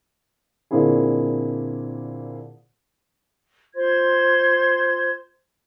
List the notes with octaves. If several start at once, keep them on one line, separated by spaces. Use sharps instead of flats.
A#2 D3 A#3 C4 E4 G#4
F4 C5 C6 G#6